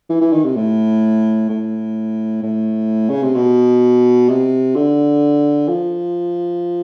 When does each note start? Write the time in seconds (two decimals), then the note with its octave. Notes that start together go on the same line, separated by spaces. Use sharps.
0.09 E3
0.21 E3
0.33 D#3
0.44 C3
0.56 A2
1.50 A2
2.43 A2
3.10 C#3
3.23 C3
3.35 B2
4.29 C3
4.75 D3
5.68 F3